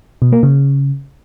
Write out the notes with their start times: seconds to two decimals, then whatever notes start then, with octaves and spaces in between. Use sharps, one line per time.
0.22 B2
0.32 A#3
0.43 C#3